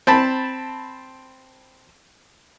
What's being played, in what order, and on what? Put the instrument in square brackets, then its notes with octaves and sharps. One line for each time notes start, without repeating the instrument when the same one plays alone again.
[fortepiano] C4 A5 B5